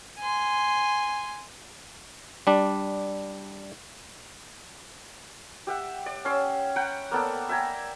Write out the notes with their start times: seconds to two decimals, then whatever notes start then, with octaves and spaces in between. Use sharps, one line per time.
0.19 G#5 C6
2.47 G3 D4
5.67 G4 E5 F#5
6.06 D5
6.25 C#4 C6 E6
6.76 F#5 G5 A#5 B5
7.12 A#3 B3 A4 D5
7.49 E5 G5 G#5 A#5